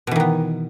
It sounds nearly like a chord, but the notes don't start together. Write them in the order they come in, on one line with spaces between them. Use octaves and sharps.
B2 E3 D#3 B3